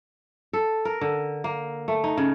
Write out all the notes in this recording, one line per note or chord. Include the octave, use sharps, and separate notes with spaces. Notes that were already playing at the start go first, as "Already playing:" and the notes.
A4
A#4
D3
A#3
A3
D#4
C#3